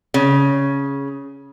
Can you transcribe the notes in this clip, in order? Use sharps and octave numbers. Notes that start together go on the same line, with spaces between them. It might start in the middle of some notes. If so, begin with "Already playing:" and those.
C#3